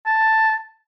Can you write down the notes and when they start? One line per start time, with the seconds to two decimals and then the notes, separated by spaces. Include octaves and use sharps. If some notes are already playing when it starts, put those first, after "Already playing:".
0.06 A5